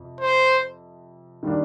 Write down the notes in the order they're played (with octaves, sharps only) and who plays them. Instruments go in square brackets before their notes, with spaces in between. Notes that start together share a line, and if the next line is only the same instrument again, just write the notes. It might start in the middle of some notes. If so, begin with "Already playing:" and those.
Already playing: [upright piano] F2 C3
[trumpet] C5
[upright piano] D#3 G3 A#3 D4